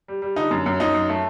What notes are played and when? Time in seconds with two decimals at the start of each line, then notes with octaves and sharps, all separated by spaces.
0.08 G3
0.22 G3
0.36 D3 D#4
0.51 F#2
0.66 F#2
0.80 F#2 D#4
0.94 F#2
1.09 A3